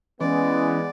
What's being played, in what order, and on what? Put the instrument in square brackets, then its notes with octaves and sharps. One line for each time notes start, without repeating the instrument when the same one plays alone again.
[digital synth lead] E3 [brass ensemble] G#3 B3 [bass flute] C#4 [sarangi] D5